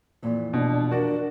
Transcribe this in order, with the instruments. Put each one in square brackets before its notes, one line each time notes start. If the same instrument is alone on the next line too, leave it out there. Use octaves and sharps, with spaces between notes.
[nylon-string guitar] F2 A#2 E3
[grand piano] B2 [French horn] D4
[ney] D4 [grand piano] F#4 D5 [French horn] A#4